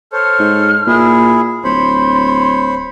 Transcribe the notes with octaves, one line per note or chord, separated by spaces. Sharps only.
A4 C5 C#5 F6
G#2
A#2 E4 G#4
D1 C5 C#5 B5 C6